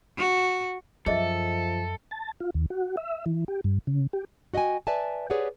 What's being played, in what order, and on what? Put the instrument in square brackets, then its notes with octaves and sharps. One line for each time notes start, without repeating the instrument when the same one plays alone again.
[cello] F#4
[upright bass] F#2 [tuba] F3 [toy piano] G#4 D#5 E5 [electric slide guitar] A4
[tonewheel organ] A5
F4
D#2
F#4
E5
E3
G4
G2
C#3
G4
[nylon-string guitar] F#4 D#5 E5 G5 G#5
B4 D5 E5 G#5 A5
G4 G#4 B4 C#5 D5 F#5